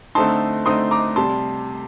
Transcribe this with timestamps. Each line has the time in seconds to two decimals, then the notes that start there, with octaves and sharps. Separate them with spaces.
0.15 D3 A3 C4 D#4 A5 C6
0.66 D3 A3 C4 D#4 C6 D#6
0.91 A#5 D6
1.16 C3 G3 A5 C6